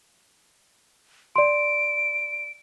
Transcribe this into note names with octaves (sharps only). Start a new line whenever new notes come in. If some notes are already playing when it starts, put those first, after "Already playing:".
D5 C6 D7